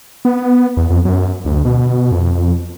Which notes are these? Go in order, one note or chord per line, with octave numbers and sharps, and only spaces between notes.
B3
E2
F2
F#2
D2
B2
F2